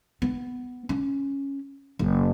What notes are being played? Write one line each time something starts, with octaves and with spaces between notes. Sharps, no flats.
B3
C#4
F#1